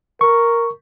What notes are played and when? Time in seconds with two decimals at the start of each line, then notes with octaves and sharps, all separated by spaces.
0.21 A#4 C#6